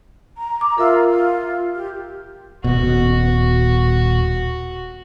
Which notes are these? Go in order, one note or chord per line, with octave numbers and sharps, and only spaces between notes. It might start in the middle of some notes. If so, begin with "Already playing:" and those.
A#5
D6
F4 A#4 E5 E6
F4
G4
D#1 B2 F#4